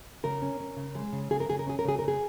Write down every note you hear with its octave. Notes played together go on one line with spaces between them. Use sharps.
C#3 A#4
C#4
C#4
C#3
G#3
C#3
C#3 G#4
A#4
C#3 G#4
A#4
C#4 G#4
A#4
C#3 G#4
C#3 A#4
G#4